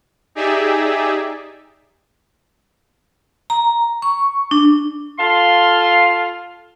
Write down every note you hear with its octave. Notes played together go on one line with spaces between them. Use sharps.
D#4 G4 G#4 D5 E5
A#5
C#6
D4
F4 A4 F5 C6